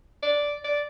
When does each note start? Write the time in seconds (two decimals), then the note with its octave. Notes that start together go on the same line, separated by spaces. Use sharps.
0.23 D5
0.64 D5